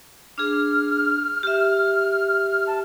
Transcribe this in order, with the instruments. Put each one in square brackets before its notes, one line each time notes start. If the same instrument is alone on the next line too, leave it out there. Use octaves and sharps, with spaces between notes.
[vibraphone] D4 G#4 [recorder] F6
[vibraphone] G4 E5
[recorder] A5